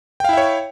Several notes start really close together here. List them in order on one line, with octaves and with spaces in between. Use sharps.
G5 F5 E4 E5 C#5